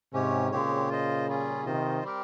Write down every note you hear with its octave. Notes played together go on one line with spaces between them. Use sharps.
G#2 C3 C#4 G4 C#5
A#2 C#3 G#3 C4 G4 C#5
F4 C5 D#5
G3 C#4 F4 G#4
C3 D#3 F4 C5 D#5
G3 C4 G4 A#4